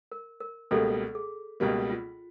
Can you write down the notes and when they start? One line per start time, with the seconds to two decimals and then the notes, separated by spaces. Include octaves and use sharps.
0.12 A#4
0.40 A#4
0.71 C#2 B2 G3 A#3 A4
1.15 G#4
1.60 C#2 B2 G3 A#3
1.90 F4